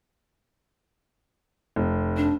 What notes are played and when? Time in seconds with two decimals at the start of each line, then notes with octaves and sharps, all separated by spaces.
1.76 F1
2.17 D4